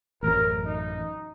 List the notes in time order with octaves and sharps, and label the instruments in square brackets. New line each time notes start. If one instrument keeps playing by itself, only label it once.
[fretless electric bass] A1 F#2 [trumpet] A#4
[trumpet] D#4